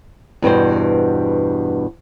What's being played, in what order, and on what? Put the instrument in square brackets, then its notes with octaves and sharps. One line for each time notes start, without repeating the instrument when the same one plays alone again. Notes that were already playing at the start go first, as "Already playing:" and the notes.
[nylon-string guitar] E2 G2 B2 C5